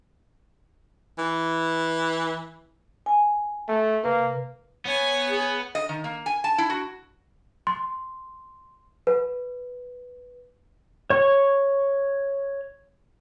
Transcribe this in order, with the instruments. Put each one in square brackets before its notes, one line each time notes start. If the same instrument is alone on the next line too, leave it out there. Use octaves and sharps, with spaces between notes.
[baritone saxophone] E3
[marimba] G#5
[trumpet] A3
[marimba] C3 B4 [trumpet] A#3
[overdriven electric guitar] B3 [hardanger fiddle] C#5 G#5
[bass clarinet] G#4
[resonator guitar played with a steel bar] D#5
D#3
A#3
G#5
A5
E4
F#4
[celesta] C6
B4
[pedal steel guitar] C#5 C#6